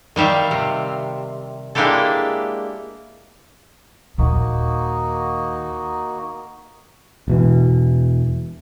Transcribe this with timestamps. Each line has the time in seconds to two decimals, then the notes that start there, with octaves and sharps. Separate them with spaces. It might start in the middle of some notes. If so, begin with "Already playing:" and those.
0.16 D#3 G3 E5 F5
0.51 C3
1.75 G#3 A#3 D4 E4 G4 A4
4.18 D#1 D#2 A#3 D#4 F#4
7.28 E1 B2 E3